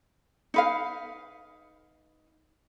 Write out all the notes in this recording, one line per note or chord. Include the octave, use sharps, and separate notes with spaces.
D#4 B4 F5